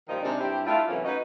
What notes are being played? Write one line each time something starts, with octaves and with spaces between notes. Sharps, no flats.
A#2 D#3 F3 G3 D#4
C3 G#3 D4 D#4 D5
G2 C4 E4 G4
A3 D4 E4 F4
C3 E3 F#3 A3 A#3 C#4
C#4 D#4 F#4 B4 D#5